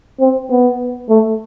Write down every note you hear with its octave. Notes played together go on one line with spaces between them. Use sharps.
C4
B3
A3